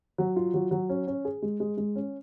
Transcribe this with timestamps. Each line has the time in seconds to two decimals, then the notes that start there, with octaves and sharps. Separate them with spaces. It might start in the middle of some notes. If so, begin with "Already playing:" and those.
0.18 F#3
0.36 F4
0.54 F#3
0.71 F#3
0.89 C#4
1.07 C#4
1.25 G#4
1.42 G#3
1.60 G#3
1.77 G#3
1.96 C#4